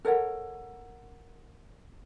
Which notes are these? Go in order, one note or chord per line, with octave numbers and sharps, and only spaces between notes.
A4 A#4 C#5 F#5